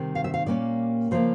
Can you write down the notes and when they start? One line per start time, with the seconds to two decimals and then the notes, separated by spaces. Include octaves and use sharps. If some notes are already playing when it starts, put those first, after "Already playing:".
Already playing: C3 D#3 G3 C4
0.15 F5
0.24 E5
0.34 F5
0.46 A#2 G3 A#3 C#4 D5
1.11 C#3 F3 A#3 C5